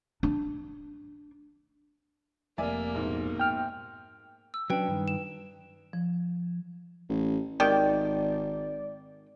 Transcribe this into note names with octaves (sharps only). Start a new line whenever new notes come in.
D4
F1 A#3 D5 E5 G#5
A#1 G#2 B2
G5 F6
E6
F#3 C#4 D4 B4 G5
G2 D#3
E7
F3
A1
G#1 D#3 G4 D5 G5